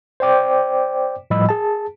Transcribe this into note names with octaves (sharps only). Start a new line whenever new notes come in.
C5 D5 G5 D6
A2 F3 G3 D#5 B5 E6
G#4 A5